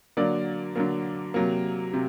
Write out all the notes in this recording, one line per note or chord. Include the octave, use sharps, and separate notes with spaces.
D3 F#3 A#3 D5
D3 F#3 A#3
C3 F#3 A#3
C3